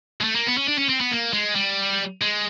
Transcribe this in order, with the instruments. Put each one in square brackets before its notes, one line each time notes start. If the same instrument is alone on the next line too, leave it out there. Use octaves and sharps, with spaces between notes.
[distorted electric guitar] G#3
A3
A#3
B3
C#4
D4
C#4
C4
B3
A#3
G#3
G3
G#3